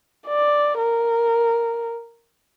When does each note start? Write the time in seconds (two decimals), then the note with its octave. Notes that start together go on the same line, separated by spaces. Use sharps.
0.27 D5
0.78 A#4